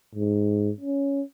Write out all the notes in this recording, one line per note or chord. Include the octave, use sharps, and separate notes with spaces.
G#2
C#4